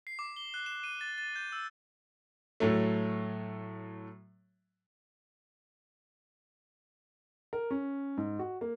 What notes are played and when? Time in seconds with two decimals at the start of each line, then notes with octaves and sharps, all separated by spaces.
0.07 C7
0.19 D6
0.36 G7
0.54 F#6
0.66 E7
0.84 D#7
1.01 A6
1.18 A6
1.36 G6
1.52 E6
2.60 A2 F#3 A3
7.53 A#4
7.71 C#4
8.17 G#2
8.39 F#4
8.61 A#3